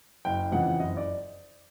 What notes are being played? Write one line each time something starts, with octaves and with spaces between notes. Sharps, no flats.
F#1 G5
F2 C#3 E3 F#5
F#1 D#5
D5